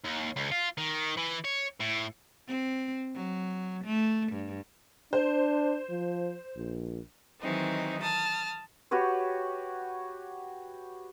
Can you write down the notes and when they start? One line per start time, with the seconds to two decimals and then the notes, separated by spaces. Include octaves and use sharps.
0.04 D#2
0.36 C#2
0.51 F4
0.78 D#3
1.17 E3
1.45 C#5
1.80 A2
2.48 C4
3.15 F#3
3.85 A3
4.32 G2
5.13 D4 C5
5.90 F3
6.57 A#1
7.40 D#3 E3 F#3 G#3 C4 D#4
8.00 A5 D#6 F6
8.91 F#4 G4 B4 C#5